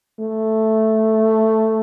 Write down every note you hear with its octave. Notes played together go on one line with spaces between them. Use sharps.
A3